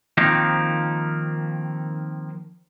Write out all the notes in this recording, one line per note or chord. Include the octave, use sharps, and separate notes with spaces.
D#3 F3 A#3 C4 D#4